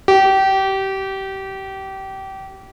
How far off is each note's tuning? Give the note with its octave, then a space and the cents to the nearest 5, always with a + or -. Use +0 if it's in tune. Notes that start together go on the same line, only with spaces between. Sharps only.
G4 -25